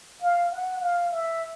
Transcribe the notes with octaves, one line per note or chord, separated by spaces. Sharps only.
F5
F#5
F5
E5